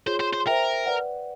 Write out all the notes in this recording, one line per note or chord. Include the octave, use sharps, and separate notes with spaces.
F4 G#4 C5 C#5
C5
C5
A#4 C5 E5 G5
B4 D5 F#5